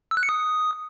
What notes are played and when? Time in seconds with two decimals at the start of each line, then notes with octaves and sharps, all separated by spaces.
0.11 E6
0.17 F#6
0.23 C#7
0.29 D#6